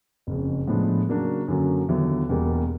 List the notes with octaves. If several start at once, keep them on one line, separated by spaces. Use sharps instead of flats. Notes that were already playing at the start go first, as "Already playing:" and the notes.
F#1 F2 C#3
A2 F3 G#3 B3 D4
C#3 F#3 A#3 D4 F#4
F#2 D3 F#3 A#3
D#2 D3 F#3 B3 E4
E1 E2 B2 G3 A#3